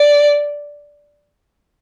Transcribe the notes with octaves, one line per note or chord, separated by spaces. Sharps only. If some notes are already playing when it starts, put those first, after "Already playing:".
Already playing: D5